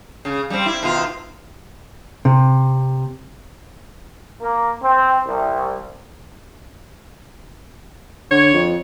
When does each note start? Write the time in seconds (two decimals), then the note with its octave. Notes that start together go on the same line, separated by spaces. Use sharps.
0.25 C#3
0.50 G3 C4
0.66 E4
0.83 B2 D#3 F4
2.25 C3
4.41 A#3
4.83 C4
5.27 C2
8.31 D3 C#5
8.53 F2